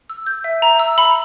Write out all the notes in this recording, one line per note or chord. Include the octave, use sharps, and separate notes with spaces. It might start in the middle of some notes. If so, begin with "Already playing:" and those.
E6
G6
E5
A#5
E6
B5